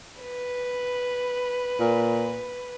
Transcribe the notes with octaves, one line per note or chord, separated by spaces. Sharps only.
B4
A#2